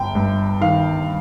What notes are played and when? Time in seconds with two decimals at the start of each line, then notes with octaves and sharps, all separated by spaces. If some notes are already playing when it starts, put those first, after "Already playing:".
Already playing: G1 G5
0.15 G2
0.61 D#3 F5